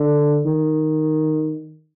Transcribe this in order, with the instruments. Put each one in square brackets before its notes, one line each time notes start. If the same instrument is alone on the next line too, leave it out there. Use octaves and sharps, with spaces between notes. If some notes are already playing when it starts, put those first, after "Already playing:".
Already playing: [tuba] D3
D#3